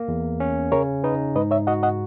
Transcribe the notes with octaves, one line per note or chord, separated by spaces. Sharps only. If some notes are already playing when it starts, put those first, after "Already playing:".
Already playing: A#3
E2
C#4
C#3 A#4 C#5
D#4 B4 D#5
G#2 B4 D#5
C#5 E5
F#4 D#5 F#5
D#5 F#5